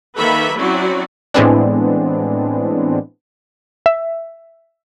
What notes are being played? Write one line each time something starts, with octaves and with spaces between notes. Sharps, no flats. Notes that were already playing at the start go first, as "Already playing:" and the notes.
D#3 A#3 A4 B4 E5 B5
F#3 C4 C#4 E4 F#4 D5
A2 E3 G#3 B3 C4 D4
E5